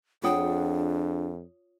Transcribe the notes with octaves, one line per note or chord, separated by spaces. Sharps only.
F2 D4 F4 G#4 C#5 F#5 G5 D#6